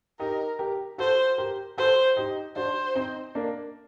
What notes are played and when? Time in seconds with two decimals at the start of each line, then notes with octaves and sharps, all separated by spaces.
0.20 D#4 G4 A#4
0.59 G4 A#4
0.98 F#4 A4 C5
1.38 G4 A#4
1.77 F#4 A4 C5
2.17 D#4 G4
2.56 D4 F#4 C5
2.95 C4 D#4
3.35 A#3 D4